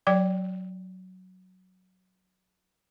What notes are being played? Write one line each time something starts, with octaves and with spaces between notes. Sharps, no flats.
F#3 D5 G5